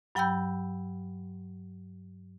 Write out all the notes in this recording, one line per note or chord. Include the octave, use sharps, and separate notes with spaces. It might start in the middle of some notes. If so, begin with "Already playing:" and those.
G2 F#3 G5 B5 E6 G6